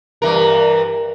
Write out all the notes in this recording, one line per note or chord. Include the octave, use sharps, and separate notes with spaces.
G2 E3 A#4